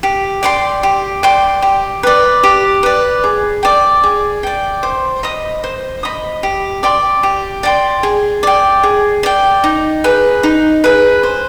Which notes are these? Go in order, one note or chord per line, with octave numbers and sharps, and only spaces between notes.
G4
D5 G5 C6
G4
D5 G5 C6
G4
B4 D5
G4
B4 D5
G#4
D5 G5
G#4
D5 G5
C5
D#5 B5 D#6
C5
D#5 B5 D#6
G4
D5 G5 C6
G4
D5 G5 C6
G#4
D5 G5
G#4
D5 G5
D#4
G#4 B4
D#4
G#4 B4
C5